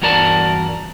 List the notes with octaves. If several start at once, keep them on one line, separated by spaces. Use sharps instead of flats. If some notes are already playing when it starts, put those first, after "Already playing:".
E2 G2 F#4 A#4 D5 A5